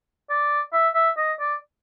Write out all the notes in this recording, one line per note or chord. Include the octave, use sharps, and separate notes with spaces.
D5
E5
E5
D#5
D5